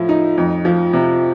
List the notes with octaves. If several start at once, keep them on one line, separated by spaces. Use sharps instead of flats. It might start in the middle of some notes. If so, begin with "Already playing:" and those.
Already playing: A2 F3
D#4
F2
F3
C3